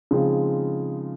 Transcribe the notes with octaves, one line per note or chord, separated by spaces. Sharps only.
C#3 F3 G#3 C4 D#4